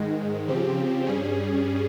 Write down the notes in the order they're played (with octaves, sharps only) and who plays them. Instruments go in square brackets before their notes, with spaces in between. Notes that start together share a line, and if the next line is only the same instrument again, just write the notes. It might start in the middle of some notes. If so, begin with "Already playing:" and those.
Already playing: [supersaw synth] G#2 D#3 G#3
C#3 F3 C4 G4
G2 G3 C#4 G#4